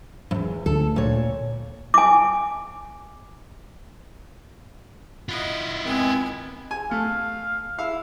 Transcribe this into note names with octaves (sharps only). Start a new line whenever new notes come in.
E2 G2
D2 A4
A#2 C#5
G#5 D6
E4 F4 D#5 F#5
D#3 G#3 B3 C4 G#5
G#5
A3 F5
E4 F5